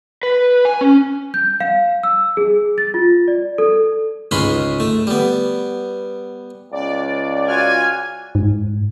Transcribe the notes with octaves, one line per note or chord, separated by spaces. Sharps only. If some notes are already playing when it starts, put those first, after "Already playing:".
B4
G#5
C#4
G6
F5
E6
G#4
A6
F4
D5
A4
C#2 G#2 G#3 C#4 B5 C6
A3
G3 B3
C#2 D5
F4 F#4 G#5 F6
G#2